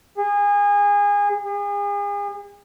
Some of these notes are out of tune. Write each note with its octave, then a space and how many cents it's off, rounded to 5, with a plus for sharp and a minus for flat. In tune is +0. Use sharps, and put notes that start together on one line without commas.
G#4 -25
G#4 -40